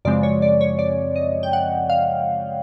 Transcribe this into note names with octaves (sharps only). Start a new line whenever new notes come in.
F#2 C#3 F3 G#3 C4 D5
C#5
D5
C#5
D5
D#5
G5
F#5
F5